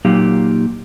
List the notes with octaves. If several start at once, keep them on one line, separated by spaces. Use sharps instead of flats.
A#2 F#3 A#3 D#4 G4 F5